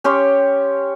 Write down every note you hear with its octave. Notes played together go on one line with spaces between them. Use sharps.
C#4 G4 C#5 C6